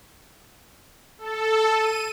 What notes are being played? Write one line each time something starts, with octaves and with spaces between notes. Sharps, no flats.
A4
D#7